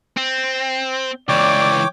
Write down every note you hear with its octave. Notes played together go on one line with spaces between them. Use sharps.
C4
C#2 E3 C#5 D5 G5 D6